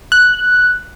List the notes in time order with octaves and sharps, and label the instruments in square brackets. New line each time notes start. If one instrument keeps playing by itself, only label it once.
[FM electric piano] F#6